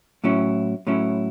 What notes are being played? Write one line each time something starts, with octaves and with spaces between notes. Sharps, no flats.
A2 F#3 C#4 E4
A2 F#3 C#4 E4